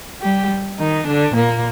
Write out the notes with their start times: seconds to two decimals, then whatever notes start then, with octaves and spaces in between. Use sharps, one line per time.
0.21 G3 G4
0.79 D#3 D#4
1.06 D3 D4
1.36 A#2 A#3